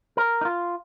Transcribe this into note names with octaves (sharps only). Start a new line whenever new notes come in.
A#4
D#4
F4